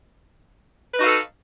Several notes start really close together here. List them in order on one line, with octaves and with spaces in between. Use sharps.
B4 D#4 F#4 F5 A4